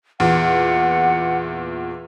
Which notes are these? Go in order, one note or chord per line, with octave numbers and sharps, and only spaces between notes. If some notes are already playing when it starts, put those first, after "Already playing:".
E2 A#2 F#5